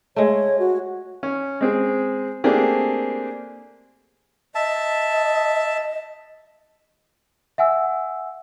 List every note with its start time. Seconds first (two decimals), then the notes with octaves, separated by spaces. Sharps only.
0.16 G#3 A3 C#5
0.59 F#4
1.23 C#4
1.61 G#3 C4 G#4
2.44 A3 A#3 C4 D4 G4 G#4
4.55 D#5 E5 A5
7.58 E5 F#5 G#5 E6